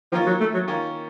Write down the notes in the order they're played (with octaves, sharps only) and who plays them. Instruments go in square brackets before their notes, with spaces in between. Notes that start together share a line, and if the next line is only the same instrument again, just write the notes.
[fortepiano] D#3 A#3 C#4 F4 [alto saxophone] F3
[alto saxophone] F#3
A3
F#3
[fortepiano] D#3 A#3 C#4 F4